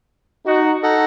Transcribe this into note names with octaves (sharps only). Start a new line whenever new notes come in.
D#4 F#4
D#4 A4 D#5 F#5